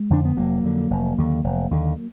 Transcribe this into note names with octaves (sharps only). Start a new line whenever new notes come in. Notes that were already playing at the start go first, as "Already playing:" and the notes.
Already playing: G#3
F2 D3 D4
B3
F1 F#3 A#3
F2 D3
F1
D#2 D3
F1
D#2 D3